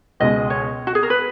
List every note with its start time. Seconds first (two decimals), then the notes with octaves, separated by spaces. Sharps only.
0.20 C#2 B2 G#3 D#5
0.50 C#5
0.87 F#4
0.95 G#4
1.03 A#4
1.10 B4